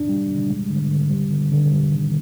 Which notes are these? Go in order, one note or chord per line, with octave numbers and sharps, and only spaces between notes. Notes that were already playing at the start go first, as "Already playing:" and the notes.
Already playing: D4
G3
G3
G#3
D3
D3
G3
D3
D3
G3
D#3